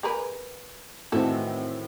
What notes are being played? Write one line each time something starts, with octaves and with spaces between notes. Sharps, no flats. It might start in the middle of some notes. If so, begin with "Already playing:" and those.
G#4 A#4 B4
A2 D#3 E3 C4 F#4 A4